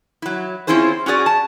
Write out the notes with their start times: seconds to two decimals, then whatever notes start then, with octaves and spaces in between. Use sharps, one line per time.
0.22 F#3 E4
0.67 C4 C#4 E4 F4 G#4 C5
1.06 C#4 F#4 G#4 D5
1.26 A5